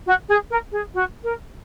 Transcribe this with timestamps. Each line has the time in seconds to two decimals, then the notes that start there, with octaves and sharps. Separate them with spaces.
0.06 F#4
0.28 G#4
0.50 A#4
0.72 G#4
0.94 F#4
1.23 A#4